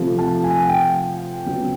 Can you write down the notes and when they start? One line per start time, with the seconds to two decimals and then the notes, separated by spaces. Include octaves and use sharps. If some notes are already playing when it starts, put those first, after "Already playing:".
Already playing: C3 F3 A3
0.18 A5
0.44 G#5
0.63 F#5
0.69 G5
1.46 C#3 F#3 B3